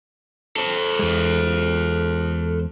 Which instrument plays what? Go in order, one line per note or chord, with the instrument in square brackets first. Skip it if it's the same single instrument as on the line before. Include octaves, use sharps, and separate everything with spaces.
[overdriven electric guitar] A4 C5
[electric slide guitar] E2 G#3